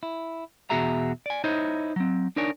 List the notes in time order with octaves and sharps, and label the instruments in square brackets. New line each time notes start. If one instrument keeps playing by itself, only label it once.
[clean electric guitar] E4
E2 B2 F#4 G#4 E5 A#5
D5 G#5
D#4 E4 C5 C#5 D#5
F#3 C4
D4 D#4 A#4 C#5 D5 G#5